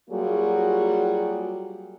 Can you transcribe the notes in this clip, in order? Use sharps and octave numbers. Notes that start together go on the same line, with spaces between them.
F#3 G3 A#3 F4 F#4 G#4